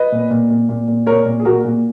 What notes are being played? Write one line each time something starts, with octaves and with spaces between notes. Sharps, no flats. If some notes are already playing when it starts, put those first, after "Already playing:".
Already playing: B4 D#5
A#2
A#2
A#2
A#2
A#2
A#2 A#4 C#5
A#2
G#4
A#2 F#4 A#4
A#2